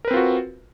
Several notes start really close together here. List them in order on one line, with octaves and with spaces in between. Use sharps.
A#4 B4 C4 F4 F#4